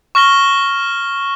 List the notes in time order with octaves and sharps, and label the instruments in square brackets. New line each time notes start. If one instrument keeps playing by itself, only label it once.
[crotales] C#6 F6 A#6 G7